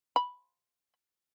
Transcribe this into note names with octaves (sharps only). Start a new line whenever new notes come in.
B5